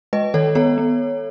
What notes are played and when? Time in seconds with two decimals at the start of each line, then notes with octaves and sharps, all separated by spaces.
0.13 G#3 B4 D#5
0.34 D#3 A4 C#5
0.55 B3 A4 C#5
0.78 B3